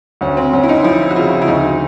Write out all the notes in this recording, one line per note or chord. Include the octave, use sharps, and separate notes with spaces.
D2 C#4
C4
D2 C#4
E4
D#4
F3 E4
F#4
C#3 F4
E4
D2 D#4